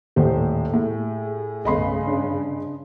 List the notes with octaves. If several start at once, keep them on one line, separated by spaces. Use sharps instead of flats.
D#1 A2 G4 C5
A2 G#4
C2 G2 C#3 A3 B3 D#5 B5 C6
D4